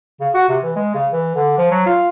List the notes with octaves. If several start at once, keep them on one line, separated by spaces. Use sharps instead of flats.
C#3
F#4
C3
E3
G#3
C#3
E3
D3
F3
F#3
F4